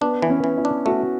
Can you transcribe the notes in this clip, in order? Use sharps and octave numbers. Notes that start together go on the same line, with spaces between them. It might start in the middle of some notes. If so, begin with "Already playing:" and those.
B3 D4
E3
C#4
E3
E4
D4
A3 F#4